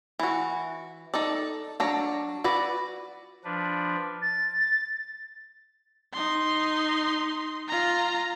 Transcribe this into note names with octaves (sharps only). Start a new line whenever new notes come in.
E3 F#4
D#4 A4 D5
F#3 D4 A#5
F#4 B4 D5
F3 D4 B4
A6
D#4 C6
F4 A#5